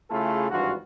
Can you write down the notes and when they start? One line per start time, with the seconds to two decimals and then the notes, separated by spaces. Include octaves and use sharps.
0.11 C#3 A3 E4 F4 G#4 A4
0.51 G#1 G2 E3 F4 F#4